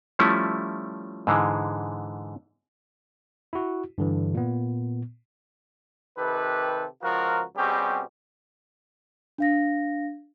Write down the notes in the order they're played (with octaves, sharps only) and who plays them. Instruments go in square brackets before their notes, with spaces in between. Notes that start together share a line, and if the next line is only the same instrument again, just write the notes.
[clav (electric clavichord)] F3 G3 A3 C#4 E4
G#2 D3 E3 G#3
[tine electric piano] E4 F#4
G2 D3 E3
A#2 B3
[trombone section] C3 D#3 G4 A4 B4
C#2 F3 F4 F#4 A#4
B2 G3 C4 C#4 G4 G#4
[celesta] D4 F5 A#6